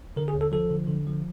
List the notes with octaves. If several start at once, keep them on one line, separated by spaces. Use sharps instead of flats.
D3 A#4
G#4
D#2
A4
F3 A4
D3
D3
F3